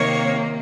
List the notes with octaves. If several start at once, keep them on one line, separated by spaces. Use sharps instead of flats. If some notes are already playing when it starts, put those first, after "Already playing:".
Already playing: C3 D#3 A#3 C#5